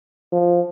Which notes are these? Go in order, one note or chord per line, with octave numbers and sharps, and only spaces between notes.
F3